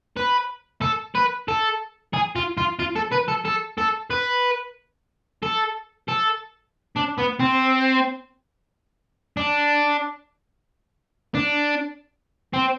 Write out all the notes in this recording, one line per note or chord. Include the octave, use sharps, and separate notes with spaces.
B4
A4
B4
A4
G#4
F4
F4
F4
A4
B4
A4
A4
A4
B4
A4
A4
D4
B3
C4
D4
D4
C4